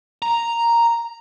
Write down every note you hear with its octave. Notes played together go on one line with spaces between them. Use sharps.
A#5